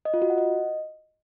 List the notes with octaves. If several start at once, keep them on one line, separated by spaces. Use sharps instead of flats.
D#5
F4
F#4
F#5
D#5